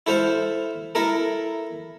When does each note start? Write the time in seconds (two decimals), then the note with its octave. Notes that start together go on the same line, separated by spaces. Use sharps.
0.07 E4 A4 C5 F5
0.95 E4 A4 A#4